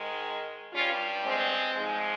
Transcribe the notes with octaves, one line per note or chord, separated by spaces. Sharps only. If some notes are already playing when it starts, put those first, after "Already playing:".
Already playing: G#2 D#3 G#3
G2 G3 C#4 F4
G#3 C4
G#2 F3 G#3